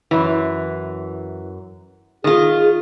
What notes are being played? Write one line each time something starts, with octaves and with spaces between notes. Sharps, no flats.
F#2 E3
D#3 F4 G#4 D#5